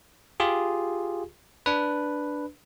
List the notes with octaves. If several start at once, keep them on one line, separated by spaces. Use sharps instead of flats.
F4 G4 G#4
D4 B4